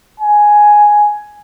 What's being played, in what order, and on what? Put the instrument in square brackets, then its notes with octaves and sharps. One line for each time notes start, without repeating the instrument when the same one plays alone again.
[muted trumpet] G#5